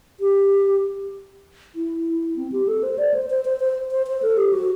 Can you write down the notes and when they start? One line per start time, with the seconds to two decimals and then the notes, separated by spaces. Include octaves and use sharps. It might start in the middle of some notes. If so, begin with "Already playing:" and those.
0.20 G4
1.75 E4
2.36 C4
2.52 G4
2.68 A4
2.83 C5
2.98 D5
3.14 C5
3.30 C5
3.45 C5
3.60 C5
3.92 C5
4.07 C5
4.22 A4
4.37 G4
4.53 F#4